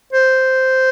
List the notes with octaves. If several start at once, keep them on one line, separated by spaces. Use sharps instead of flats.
C5